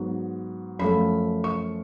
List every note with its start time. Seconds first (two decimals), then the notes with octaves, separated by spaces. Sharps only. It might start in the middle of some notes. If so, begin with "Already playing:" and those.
Already playing: G#2 F#3 B3
0.79 F#2 F3 A3 B5
1.44 C#6